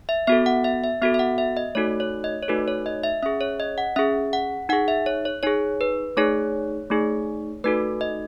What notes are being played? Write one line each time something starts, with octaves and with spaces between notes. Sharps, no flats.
E5
B3 F#4 A4 E5
F#5
E5
E5
B3 F#4 A4 E5
E5
F#5
E5
D#5
A3 D#4 F#4 A4 C#5
C#5
D#5
C#5
A3 D#4 F#4 A4 B4
C#5
D#5
E5
C#4 G#4 E5
C#5
D#5
F#5
C#4 G#4 E5
F#5
D#4 G#4 F#5
E5
C#5
C#5
D#4 G#4 C#5
B4
A3 D#4 G#4 C#5
A3 D#4 G#4
A3 D#4 F#4 A4 B4
D#5